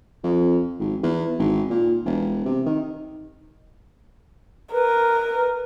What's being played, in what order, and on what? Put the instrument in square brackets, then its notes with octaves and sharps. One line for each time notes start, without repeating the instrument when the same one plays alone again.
[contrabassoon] F2
G#1
E2
G#1
A#2
E1
C3
D#3
[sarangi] A#4 [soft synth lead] B4